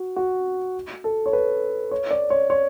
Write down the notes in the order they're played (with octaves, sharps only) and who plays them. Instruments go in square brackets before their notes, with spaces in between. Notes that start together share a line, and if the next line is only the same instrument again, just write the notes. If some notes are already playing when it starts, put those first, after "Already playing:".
Already playing: [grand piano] F#4
F#4
A4
C#5
B4
C#5
D5
C#5
C#5